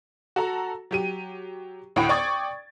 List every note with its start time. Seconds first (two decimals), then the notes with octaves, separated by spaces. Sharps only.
0.36 F#4 A4 A#5
0.91 F#3 G4 D#7
1.96 D2 A2 E4 F#5 G5 D7
2.09 D5 G5 C#6 D#6 G#6 A6